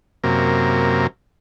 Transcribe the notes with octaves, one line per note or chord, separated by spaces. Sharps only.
F#2 C3 A#3